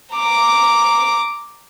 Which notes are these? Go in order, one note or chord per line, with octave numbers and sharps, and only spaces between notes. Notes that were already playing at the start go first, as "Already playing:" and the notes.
A#5 D6